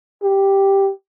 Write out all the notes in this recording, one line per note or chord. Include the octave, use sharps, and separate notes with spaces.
G4